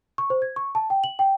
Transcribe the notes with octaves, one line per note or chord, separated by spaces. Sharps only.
C#6
C5
G#6
C#6
A5
G5
F#7
G5